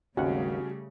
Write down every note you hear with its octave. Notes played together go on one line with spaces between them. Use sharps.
G#1 D#2 C#3 G3 A3 C#4 F#4 F#5